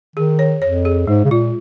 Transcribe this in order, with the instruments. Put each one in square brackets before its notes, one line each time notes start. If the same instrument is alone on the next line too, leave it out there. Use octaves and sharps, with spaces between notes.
[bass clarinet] D#3 [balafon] G#4
[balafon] C#5
[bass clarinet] F2 [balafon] C#5
[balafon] G#4
[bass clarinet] G#2 [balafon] G#3
[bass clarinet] C#3
[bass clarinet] A#2 [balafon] F4